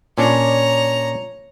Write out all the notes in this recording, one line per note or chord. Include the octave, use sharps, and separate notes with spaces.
A#2 C#4 D4 C#5 A#5